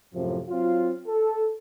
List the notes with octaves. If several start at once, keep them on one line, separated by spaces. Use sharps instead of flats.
F#2 A2 C3 F3
F#3 C4 F4
A4